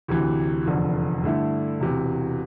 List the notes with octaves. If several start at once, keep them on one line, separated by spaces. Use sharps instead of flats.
D2 C3 E3
F1 E2 D3 F3
G2 D3 A3 E4
E1 C3 E3